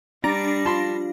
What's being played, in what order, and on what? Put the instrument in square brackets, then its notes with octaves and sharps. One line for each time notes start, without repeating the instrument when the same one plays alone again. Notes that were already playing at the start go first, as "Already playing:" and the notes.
[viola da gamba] G3 [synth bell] D4 A#6 [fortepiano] A#5
[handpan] F4 [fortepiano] A5 B5 C6